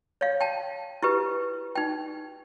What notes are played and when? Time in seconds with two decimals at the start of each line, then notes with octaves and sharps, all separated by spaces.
0.21 C#5 F5
0.40 G5 A5
1.03 E4 G4 B4
1.75 D#4 G5